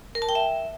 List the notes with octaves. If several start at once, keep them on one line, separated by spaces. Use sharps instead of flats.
A#4
A5
G5
E5